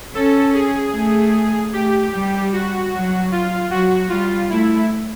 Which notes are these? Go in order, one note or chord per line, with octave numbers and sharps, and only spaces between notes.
C#4 A4
G#4
A3
A3 G4
G3
F#4
F#3
F4
F#3 F#4
G3 F4
A3 E4